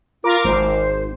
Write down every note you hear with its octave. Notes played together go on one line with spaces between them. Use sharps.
F4 A#4 D6
G#1 C5